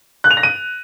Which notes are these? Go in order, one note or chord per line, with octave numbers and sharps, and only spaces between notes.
F#6
F7
A#6
D#7